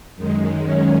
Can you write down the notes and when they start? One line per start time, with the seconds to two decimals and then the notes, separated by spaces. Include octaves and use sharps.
0.16 F#2 D#3 G#3
0.65 C#4